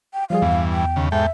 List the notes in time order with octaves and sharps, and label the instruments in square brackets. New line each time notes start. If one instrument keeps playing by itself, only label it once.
[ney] G5
[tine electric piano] F3 G3 G#4 [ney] F5
[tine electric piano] E2 [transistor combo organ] G2 E3
[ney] G5
[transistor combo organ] D#2 C#3
[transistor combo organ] G#2 A4 G5 [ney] E5